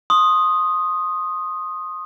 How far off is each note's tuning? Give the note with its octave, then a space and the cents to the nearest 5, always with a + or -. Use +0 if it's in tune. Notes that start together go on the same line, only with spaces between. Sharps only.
C6 +30 D#6 +0